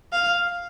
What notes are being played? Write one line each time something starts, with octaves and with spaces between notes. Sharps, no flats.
F5